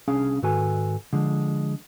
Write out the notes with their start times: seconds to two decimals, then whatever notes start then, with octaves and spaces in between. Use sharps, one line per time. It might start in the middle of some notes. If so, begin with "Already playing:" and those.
0.08 C2 C#4 D4 G#4 F5
0.42 G#2 D#3 F#4 A4 B4 G#5
1.13 D3 F3 G#3